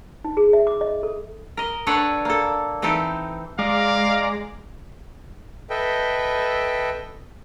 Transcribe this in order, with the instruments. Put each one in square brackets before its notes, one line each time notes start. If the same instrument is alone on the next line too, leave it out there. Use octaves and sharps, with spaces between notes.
[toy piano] D#4
G#4
E5
D6
D#5
A4
[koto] A#4 D#5
D4 A4 B4 C#5 D5 F#5
A#3 A4
E3 C4 D#4 G4 A4
[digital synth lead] G#3 [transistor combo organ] D5 A#5 [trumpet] F5
[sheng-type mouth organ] A4 B4 D#5 E5 G5